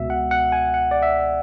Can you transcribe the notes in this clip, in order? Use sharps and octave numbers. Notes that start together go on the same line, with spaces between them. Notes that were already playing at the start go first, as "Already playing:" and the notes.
Already playing: C#2 B2 E5
F#5
F#5
G#5
F#5
D5
E5